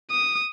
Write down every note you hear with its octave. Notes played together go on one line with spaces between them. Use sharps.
D#6